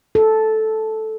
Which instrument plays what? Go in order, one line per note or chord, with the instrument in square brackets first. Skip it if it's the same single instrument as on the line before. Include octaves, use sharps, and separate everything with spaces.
[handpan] A4